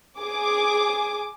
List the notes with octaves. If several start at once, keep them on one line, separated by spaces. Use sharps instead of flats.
G#4 D6